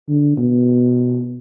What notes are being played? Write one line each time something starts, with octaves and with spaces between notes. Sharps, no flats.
D3
B2